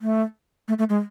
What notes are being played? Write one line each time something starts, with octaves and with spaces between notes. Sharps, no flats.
A3
A3
A3
G#3